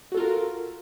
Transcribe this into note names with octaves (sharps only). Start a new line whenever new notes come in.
F4 F#4 A4 A#4